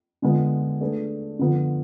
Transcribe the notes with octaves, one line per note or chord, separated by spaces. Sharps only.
D3 G#3 B3 F4
A3 D4 G#4 B4
D3 F3 B3 F4